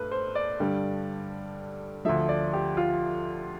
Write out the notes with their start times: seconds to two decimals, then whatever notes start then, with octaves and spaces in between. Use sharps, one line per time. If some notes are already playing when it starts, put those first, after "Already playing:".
Already playing: G2 A3 B4
0.11 C5
0.35 D5
0.60 G2 D3 G3
2.05 D2 D3 F3 E5
2.29 D5
2.53 G4
2.77 F4